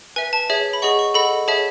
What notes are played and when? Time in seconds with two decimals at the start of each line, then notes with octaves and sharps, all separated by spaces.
0.16 B4 E5 G#5
0.33 A5
0.49 G#4 C#5 E5
0.73 B5
0.82 G#4 D#5 F#5 C#6
0.99 C#6
1.14 A4 D#5 F#5 B5
1.48 G#4 C#5 E5 A5